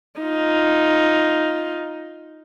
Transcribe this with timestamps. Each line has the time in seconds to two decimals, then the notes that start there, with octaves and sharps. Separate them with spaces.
0.20 D#4 F4